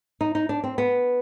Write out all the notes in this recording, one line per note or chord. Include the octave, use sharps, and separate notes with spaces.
D#4
D#4
D4
C4
B3